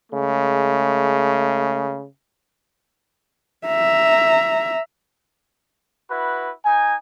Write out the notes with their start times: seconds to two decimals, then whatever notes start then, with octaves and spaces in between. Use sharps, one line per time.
0.11 C#3 G#3 A3
3.67 E5 A#5
6.09 E4 F#4 B4
6.64 D#4 G#5